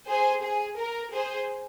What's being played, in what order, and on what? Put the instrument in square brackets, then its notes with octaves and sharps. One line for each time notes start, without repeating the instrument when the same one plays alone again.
[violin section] G#4 C5
G#4
A#4
G#4 C5